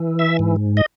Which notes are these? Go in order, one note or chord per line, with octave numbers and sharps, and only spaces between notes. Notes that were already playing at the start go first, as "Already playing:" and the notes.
Already playing: E3
E5
G#2
D#5